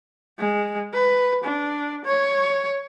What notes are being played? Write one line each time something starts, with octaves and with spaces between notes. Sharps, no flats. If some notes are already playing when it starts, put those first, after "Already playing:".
G#3
B4
D4
C#5